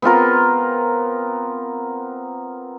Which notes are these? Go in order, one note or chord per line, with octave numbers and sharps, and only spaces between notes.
B3 C4 F4 A#4